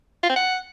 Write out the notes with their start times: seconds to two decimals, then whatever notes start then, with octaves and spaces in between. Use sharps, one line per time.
0.23 F4
0.30 C4
0.36 F#5